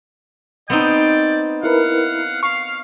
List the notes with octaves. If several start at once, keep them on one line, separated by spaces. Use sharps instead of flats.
B3 C4 D#4 D5 G5
E4 A#4 B4 F5 F#5
F5 C#6